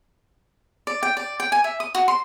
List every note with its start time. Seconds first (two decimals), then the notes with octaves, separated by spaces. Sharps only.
0.87 D5
1.03 G5
1.17 D5
1.40 G5
1.52 G#5
1.64 E5
1.80 D#6
1.95 F#4
2.08 C6